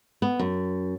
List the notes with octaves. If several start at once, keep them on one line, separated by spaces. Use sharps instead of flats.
B3
F#2